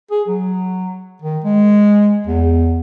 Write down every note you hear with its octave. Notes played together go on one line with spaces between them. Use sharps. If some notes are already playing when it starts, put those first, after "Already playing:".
G#4
F#3
D#3
G#3
E2